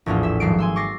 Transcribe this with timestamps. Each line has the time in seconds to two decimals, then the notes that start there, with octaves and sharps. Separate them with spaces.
0.06 A#1 E2 A2 B3 F4
0.23 E5 E6
0.40 G#1 F3 F#3 C7 D7
0.59 G#5 C6 E6
0.76 C#6 D6 A6 A#6 C7